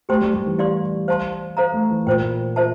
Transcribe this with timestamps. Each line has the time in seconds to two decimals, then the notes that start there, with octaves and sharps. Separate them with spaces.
0.09 A3 G4 C5 G5 C6
0.21 G3
0.34 G3
0.46 E3
0.58 E4 G4 D5 F5 C6
1.08 C5 F5 A5 C6
1.57 A4 C5 F5 A#5
1.73 A3
1.90 E3
2.07 A#2 F4 C5 G5
2.56 F4 C5 E5 A5